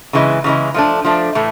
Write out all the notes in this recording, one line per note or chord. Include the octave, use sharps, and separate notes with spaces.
C#3 E3 G#3
C#3 E3 G#3
F3 A3 D4
F3 A3 D4
A2 E3 A3